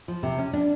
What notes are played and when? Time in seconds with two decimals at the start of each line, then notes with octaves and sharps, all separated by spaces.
0.08 F3
0.23 C3
0.38 C#4
0.53 D4